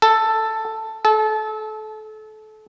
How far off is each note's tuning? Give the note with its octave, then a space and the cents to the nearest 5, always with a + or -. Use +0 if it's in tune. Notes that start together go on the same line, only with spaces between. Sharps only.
A4 +5
A4 -30